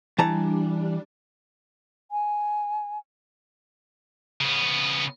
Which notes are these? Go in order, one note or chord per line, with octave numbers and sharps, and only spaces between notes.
E3 G3 D4 A5 A#5
G#5
C#3 B3